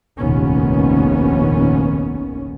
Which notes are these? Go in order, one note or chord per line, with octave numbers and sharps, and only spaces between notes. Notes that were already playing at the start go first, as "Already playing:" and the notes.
F1 A#1 D#2 D#3 B3 C#4